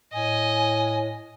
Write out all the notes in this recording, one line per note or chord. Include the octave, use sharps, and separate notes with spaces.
A2 D#5 G#5